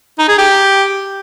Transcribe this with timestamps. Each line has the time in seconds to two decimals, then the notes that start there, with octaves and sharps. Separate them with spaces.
0.19 D#4
0.28 G#4
0.38 G4